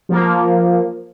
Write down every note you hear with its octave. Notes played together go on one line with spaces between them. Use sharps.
F3 A#3